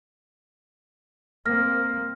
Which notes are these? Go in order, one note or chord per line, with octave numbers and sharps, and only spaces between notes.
A#3 C4 F6 A#6